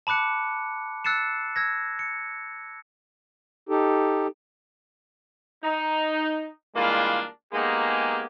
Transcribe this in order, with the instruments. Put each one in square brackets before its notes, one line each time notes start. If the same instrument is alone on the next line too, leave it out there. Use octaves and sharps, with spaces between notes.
[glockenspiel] A5 B5 D6 F#6 C#7
E6 F#6 A6 C7 C#7 E7
E6 G#6 A#6
C#7
[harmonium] D#4 G4 A4
[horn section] D#4
E3 G3 G#3 A#3 D4 F4
G#3 A#3 B3 D#4 G4 G#4